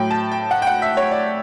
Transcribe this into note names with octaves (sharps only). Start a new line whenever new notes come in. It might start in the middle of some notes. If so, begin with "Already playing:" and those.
Already playing: A2 F#3 G5
A5
G5
F#5
G5
F#5
E5
C#5
D5